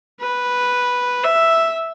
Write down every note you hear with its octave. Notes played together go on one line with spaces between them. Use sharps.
B4
E5